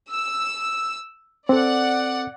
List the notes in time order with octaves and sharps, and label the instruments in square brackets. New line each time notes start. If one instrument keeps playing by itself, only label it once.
[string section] E6
[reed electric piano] C4 A4 [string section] D5 F#5